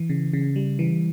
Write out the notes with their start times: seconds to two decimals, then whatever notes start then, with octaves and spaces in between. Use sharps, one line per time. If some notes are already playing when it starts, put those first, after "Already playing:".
Already playing: E3
0.09 C#3
0.33 C#3
0.56 G3
0.79 E3